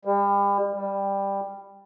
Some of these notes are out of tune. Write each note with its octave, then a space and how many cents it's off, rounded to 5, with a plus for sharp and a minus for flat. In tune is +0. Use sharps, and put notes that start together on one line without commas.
G3 +35
G3 +10